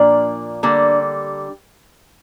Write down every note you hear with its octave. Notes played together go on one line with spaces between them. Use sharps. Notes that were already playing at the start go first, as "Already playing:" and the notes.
Already playing: A#2 F3 A#3 D4 D5
D3 G3 A#3